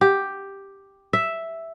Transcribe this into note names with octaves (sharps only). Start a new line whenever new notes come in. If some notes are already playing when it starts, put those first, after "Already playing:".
G4
E5